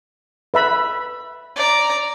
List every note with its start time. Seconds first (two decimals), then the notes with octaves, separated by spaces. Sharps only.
0.54 B4 E5 B5
1.56 D5 A#5